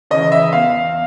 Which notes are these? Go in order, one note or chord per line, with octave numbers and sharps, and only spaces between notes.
C#3 E3 D#5
E5
E2 F5